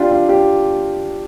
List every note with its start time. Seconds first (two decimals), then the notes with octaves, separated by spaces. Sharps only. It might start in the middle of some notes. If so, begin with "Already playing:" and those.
Already playing: D4 F4 G4
0.11 F4
0.29 G4